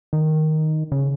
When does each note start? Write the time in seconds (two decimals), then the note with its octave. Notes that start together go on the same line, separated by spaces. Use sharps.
0.13 D#3
0.92 C#3